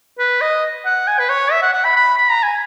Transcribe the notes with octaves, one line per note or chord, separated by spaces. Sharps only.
B4
D#5
F#5
G#5
B4
C#5
E5
F#5
F#5
B5
B5
B5
A#5
G#5